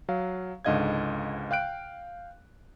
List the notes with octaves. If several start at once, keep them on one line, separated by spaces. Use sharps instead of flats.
F#3 F5
C#2 G#2 D3 D#5 F5 G#6
F5 G5 F#6 D7